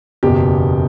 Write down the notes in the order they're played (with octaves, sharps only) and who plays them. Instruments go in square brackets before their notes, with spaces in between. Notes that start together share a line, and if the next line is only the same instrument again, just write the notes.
[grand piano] F#1 E2 B2 G4